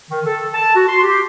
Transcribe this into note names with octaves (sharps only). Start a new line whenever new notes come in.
D#3
A4
A5
F#4
C6
G4